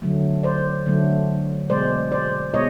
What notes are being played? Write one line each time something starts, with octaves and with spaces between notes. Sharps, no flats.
D3 F#3 A3
C5 D5
D3 F#3 A3
B2 G#3 C5 D5
C5 D5
B2 G#3 C#5 D#5